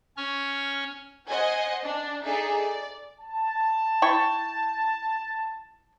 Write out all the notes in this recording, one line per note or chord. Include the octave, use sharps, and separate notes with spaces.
C#4 C#5 C#6 F6
C5 D#5 F#5 G#5 G#6
D4
D#4 G#4 A4 D5 E5
D5
A5
E4 G5 C#6